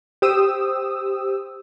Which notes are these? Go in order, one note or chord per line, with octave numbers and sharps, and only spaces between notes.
G4 C5 D#6 E6